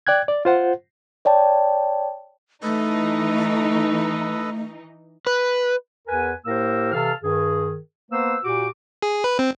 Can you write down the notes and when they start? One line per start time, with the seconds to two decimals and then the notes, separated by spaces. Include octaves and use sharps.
0.07 D5 G5 F#6 G#6
0.28 D5
0.45 F4 C5 F#5
1.25 C#5 D5 G5 A5
2.63 E3 A3 D#4 A4 B4 D#5
5.27 B4
6.07 E2 A#4 B4 G#5
6.45 A2 A#3 G4 A#4 C5 E6
6.92 C3 E3 A4 F5 A5 F6
7.22 G2 D#3 G#4
8.11 A#3 B3 B4 C5 E6
8.44 A#2 F#4 G4 D6
9.02 G#4
9.24 B4
9.39 C4